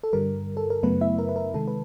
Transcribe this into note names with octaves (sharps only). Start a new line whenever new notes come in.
A4
G2 D3 G3 A#4
A4
A#4
F#2 C#3 F#3 A3 B3 B4
E4 E5
A#4
B4
A#4
C3 D#3 G#3 A4
B4